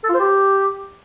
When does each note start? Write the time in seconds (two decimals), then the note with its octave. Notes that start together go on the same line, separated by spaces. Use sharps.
0.04 A4
0.09 F4
0.14 C5
0.20 G4